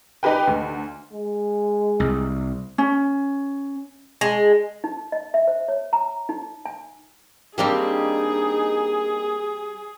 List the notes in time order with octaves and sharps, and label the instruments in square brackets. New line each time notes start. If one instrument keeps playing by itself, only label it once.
[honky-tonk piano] D#4 G4 B4 G5
D2
[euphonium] G#3
[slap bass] C2
[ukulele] C#4
[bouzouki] G#3
[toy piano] D#4
D#5
E5
C5
C#5
A#5
D#4
G#5
[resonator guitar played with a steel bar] G3 C4 G4 [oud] A#3 D4 A#4 [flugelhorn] D#4 [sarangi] G#4